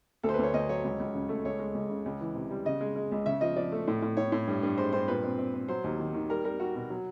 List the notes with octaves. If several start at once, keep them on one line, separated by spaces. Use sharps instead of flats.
D2 A4
C5
B4
D2 C#5
D2 D#5
F#3 C#5
C#2
C#2
C#3
A3
C#2 C#5
G#3
C#2
C#3
C#2
E3
C3
G3
C#3 D#5
G#3
G#3
C#2
C#3 E5
F3 D#5
F3 D5
A3
A2
A2
A2 C#5
A2
G2
G2
G#3 C5
G2 C5
A#2 B4
C4
C4
C4
F#3 C5
D#2
D#3
D#3
G3 A#4
G3 A#4
G3 F#4
B2
F#3